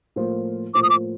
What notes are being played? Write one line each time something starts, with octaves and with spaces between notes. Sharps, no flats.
A2 F3 A#3 F4 C5
A2 F3 A#3 F4 C5 D6
D#6
D6